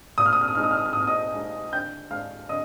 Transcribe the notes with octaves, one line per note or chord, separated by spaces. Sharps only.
A#2 D#6
F6
D#6
F6
D#6
G#3 D#4 F6
D#6
F6
D#6
F6
A#2 D#6
F6
D#5 D#6
G#3 D#4
D3 G5 G6
G#3 D4 F5 F6
D3 D#5 D#6